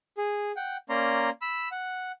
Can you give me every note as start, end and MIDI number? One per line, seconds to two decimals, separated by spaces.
0.17 0.52 68
0.56 0.77 78
0.56 0.77 79
0.89 1.30 58
0.89 1.30 61
0.89 1.30 74
0.89 1.30 82
0.89 1.30 84
1.42 1.69 83
1.42 1.69 88
1.71 2.12 78